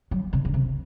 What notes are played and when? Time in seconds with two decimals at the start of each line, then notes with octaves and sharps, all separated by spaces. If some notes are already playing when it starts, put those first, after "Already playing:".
0.11 F#3
0.33 C3
0.45 C#3
0.54 C3